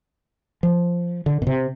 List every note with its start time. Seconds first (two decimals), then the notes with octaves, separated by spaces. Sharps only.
0.63 F3
1.26 D3
1.42 B2
1.47 C3